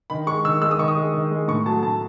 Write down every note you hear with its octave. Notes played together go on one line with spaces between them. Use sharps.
D#3 B5
G#3 C#6
D#3 E6
G#3 E6
D#6
D#3 C#6
D#6
G#3
D#3
G#3
A2 C#6
F#3 A3 A5
A2 A5